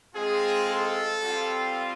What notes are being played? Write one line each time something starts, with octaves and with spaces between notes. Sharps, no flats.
G#3 C4 F4 G#4
A4
G3 C4 F4